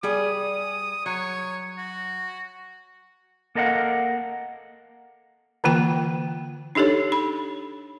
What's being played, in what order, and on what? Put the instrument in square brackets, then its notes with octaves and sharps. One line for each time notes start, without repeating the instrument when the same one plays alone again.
[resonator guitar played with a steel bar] G3 G#4 D5 [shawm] D#6
[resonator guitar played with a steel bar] F#3 [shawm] C#5
[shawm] F#4
[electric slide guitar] A#3 A4 A#4 D#5 F5 F#5
[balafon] D3 E3 A#3 F4 G5
D4 D#4 G4 A4 C#5
B5